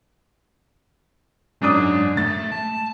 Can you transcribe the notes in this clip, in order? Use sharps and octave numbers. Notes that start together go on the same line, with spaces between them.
F#2 G#3 D4 D#4 D#6
A3 A6
A5